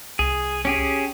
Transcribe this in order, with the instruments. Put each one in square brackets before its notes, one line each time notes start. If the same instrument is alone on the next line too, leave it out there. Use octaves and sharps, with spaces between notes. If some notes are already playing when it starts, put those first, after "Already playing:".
[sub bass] C2 [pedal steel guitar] G#4
[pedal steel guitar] C#4 G4 G#4